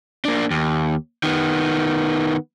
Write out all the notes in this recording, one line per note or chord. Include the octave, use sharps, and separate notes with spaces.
A#3 D4
D#2
D#3 B3